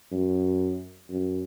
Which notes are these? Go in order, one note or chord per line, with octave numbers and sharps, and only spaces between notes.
F#2
F#2